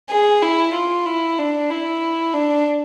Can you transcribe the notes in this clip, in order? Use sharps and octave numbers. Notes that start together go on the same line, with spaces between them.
G#4
E4
F4
E4
D4
E4
D4